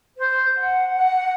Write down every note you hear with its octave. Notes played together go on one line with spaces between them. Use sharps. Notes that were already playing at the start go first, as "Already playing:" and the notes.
C5
F#5
F#5